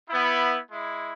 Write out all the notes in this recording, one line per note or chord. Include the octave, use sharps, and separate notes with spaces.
B3 E4
G#3 E4